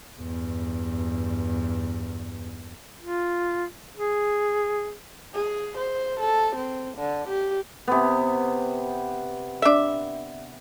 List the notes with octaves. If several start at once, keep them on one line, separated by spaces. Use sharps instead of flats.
E2 G2
F4
G#4
G#4
C5
A4
C4
D3
G4
C3 B3
D4 E5